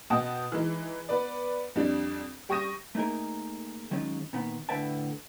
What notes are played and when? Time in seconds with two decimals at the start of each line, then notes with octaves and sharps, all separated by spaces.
0.10 B2 D#5 F#5 G5 A5 D#6
0.52 E3 G#3 D#4
1.09 B3 B4 D5
1.75 F2 G3 D4
2.49 G3 G5 C#6 D#6 A#6 D#7
2.95 A3 A#3 D#4 G#4 A#4
3.91 D#3 F#3 G#3 C#4 D#4 F4
4.33 A#2 D#3 B3
4.69 A2 D3 B4 E5 G5 A5